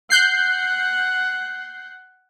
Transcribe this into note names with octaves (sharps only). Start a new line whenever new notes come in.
F#5 F#6 G6 C7